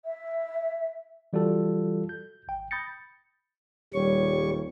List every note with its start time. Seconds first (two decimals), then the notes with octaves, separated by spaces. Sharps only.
0.05 E5
1.33 E3 G3 F4 F#4 A4
2.09 G6
2.48 G#1 G5
2.71 B5 D#6 G6 A6 A#6 C#7
3.94 D#1 G3 C#5 C#6